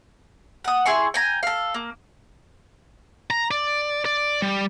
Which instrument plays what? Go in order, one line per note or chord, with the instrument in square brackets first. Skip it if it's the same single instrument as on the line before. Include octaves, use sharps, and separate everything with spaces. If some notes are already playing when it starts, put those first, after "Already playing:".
[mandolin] F#5 D#6
E4 G#4 C6 C#6
G5 G#5 A#5
A4 F5
A#3
[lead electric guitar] A#5
D5
D5
G3